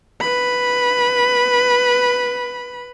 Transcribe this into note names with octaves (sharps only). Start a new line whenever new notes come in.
B4 B5